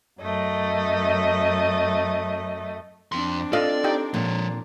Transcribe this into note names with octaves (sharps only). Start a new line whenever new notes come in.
F#2 A3 D#5
F2 C4 D4 C6
F4 A4 D5 D#5 F5
D#4 G4 G5
A#2 F3 C#5